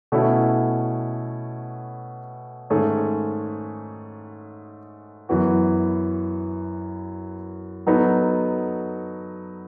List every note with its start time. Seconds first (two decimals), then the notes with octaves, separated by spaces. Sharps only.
0.12 B2 A3 C#4 E4
2.70 G#2 D#3 A3 C#4 G#4
5.29 F#2 E3 B3 F#4
7.87 F#3 B3 D#4 A4